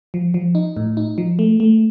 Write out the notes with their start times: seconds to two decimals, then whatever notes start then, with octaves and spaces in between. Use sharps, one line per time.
0.14 F3
0.34 F3
0.55 D#4
0.77 A2
0.97 D#4
1.18 F3
1.39 A3
1.60 A3